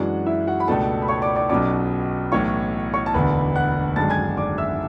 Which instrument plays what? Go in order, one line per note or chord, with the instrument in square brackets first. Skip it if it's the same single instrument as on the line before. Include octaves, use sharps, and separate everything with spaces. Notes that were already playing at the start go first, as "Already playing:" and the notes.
Already playing: [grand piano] F#2 E3 G#3 D4 F#4 F#5
E4 E5
F#4 F#5
B5
C#2 B2 A3 D4 A4 A5
B5
C#5 C#6
D5 D6
D5 D6
B1 B2 F#3 C#4 D5 D6
B1 A2 E3 C#5 C#6
C#5 C#6
A5
E1 D2 D3 B4 B5
F#5 F#6
G#1 F#2 D3 G#3 A5 A6
G#5 G#6
D5 D6
E5 E6